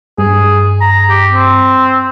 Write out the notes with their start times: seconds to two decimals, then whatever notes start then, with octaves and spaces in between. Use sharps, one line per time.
0.18 G2 G#4
0.81 A#5
1.09 G4
1.32 C4